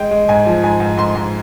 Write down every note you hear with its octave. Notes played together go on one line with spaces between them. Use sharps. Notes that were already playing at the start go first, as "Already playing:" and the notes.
Already playing: G#3 G5
G#3
G#2 G#5
F3
G#2 G#5
G#2
G#2 C6
G#2